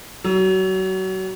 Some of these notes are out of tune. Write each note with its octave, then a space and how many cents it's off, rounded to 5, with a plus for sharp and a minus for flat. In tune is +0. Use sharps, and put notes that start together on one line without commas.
F#3 +30